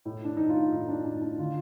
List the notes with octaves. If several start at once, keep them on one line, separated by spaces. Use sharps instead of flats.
A2
D4
A2 D#4
F4
A2 D#4
D4
A2 D4
D4
D3 F4